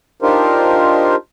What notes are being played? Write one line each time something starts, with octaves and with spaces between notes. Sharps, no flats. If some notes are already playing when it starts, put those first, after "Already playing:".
D4 D#4 F4 G4 A#4 C5